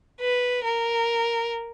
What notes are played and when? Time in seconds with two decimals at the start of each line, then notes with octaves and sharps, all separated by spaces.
0.21 B4
0.65 A#4